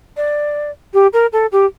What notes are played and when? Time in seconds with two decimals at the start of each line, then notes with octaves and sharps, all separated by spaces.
0.17 D5
0.94 G4
1.13 A#4
1.33 A4
1.52 G4